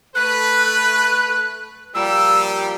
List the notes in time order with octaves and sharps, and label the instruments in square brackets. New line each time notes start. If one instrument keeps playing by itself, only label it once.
[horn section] A3 A4 B4 [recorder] F#6
[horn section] A#2 F3 G3 [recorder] E6